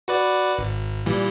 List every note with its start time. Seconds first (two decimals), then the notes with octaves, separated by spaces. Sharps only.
0.08 F#4 B4 D5
0.58 G#1
1.06 A#2 E3 G3